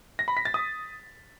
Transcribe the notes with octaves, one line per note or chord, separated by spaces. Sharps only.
A#6
B5
B6
A6
D#6